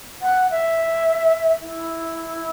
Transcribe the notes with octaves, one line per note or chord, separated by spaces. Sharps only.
F#5
E5
E4